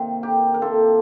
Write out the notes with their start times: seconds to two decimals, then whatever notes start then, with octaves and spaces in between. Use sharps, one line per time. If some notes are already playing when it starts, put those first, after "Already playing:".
Already playing: C3 D#3 A#3
0.23 G4 A#4
0.54 A#4
0.62 C3 D#3 A#3 F4 A4